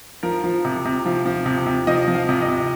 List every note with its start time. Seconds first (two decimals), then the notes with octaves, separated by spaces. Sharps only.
0.23 F3 A#4
0.44 F3
0.65 C3
0.85 C3
1.06 F3
1.26 F3
1.46 C3
1.66 C3
1.87 F3 D#5
2.08 F3
2.15 F5
2.29 C3
2.41 D#5
2.48 C3